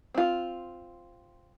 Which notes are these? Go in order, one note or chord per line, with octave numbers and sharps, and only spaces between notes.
C4 F4